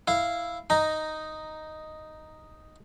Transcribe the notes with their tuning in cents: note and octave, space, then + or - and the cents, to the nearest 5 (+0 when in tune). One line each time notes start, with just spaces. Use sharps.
E4 +0 F5 -10
D#4 +0 A#5 +0